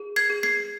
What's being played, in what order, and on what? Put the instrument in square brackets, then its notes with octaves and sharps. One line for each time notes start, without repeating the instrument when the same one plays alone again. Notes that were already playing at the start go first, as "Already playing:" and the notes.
Already playing: [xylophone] G#4
G#6 C7
G#4
G#6 C7